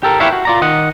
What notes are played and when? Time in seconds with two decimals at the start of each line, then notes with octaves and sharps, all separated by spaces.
0.03 G4 A4 A#4
0.20 E4 G4 B4 C#5 E5 F5
0.33 F#4
0.45 F4 D5 A#5
0.62 D#3 D#5 F#5